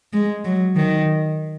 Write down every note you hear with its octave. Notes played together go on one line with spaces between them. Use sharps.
G#3
F#3
D#3